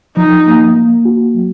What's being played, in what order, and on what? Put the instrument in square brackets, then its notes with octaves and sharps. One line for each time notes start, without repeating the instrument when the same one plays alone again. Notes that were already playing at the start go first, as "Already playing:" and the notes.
[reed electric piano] F3 [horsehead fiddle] D#4
[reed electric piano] A#3
A#3
F#4
F#3